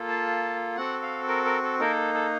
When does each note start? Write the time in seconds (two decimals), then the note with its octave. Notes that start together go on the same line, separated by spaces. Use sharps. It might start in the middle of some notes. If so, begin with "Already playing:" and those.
Already playing: A#3 F4 A4
0.08 A5
0.77 C4 F#4 A4 F#5
1.02 F5
1.28 A#4
1.45 A#4
1.63 A4
1.79 A#3 D#4 A4 A#4
2.14 A4